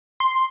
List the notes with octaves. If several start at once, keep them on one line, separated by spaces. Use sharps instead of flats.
C6